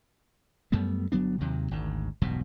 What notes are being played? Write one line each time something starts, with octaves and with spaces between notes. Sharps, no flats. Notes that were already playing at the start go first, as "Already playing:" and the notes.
F#2 G3 A3 B3
G1 F#3 B3 D4
D#2 C3 D#3 F#3
G#1 D2 G#2
E1 B1 G2 B2